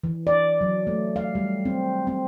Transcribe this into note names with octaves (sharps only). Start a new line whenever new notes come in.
E3
D5
F#3
A3
F5
G3
C4
C4